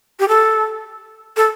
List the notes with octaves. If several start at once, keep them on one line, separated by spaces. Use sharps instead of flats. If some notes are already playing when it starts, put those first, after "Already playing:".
G4
A4
A4